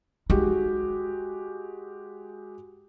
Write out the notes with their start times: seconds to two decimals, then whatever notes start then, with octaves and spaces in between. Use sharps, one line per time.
0.30 G#3 D#4 F#4 G4